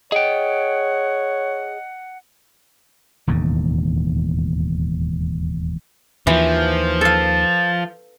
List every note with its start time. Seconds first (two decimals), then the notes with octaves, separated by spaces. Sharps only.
0.12 G#4 C#5 D#5 F#5 G5
3.27 E1 D#2 A2
6.27 D#2 E3 F3
7.01 A4 F5 A5